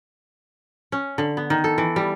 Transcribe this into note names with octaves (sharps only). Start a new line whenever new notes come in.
C#4
D3
B3
D#3
A4
E3
G3